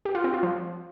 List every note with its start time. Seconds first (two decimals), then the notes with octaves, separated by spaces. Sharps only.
0.05 G4
0.15 F4
0.24 C4
0.34 F4
0.43 F3